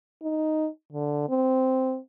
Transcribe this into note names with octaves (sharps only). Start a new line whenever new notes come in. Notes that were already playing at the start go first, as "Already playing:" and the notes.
D#4
D3
C4